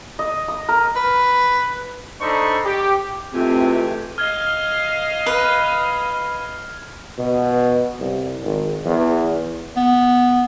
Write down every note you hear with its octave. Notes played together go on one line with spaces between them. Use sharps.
D#5
D#6
A#4
B4
D4 D#4 A4 C5 B5 C#6
G4
G#2 C3 E3 A3 C4 F4 G4 G#5
D#5 F5 F6 G#6 G7
B4
B2
C2
G#1
E2
B3